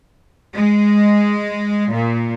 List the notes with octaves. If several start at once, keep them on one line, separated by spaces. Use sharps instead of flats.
G#3
A#2